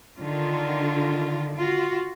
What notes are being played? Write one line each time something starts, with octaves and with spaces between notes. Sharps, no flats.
D3 D#3 F4
F4 F#4